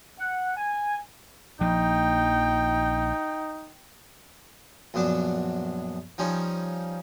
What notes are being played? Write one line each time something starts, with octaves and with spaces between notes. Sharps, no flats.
F#5
G#5
A#1 F3 A#3 D#4 G5
A#1 F#2 B3 D4 D6
F3 G3 C#4 D#4 C#5